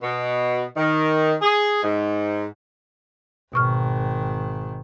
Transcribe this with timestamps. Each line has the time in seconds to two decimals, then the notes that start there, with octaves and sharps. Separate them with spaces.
0.03 B2
0.76 D#3
1.41 G#4
1.83 G#2
3.54 G#1 B2 D#3 C#6 F6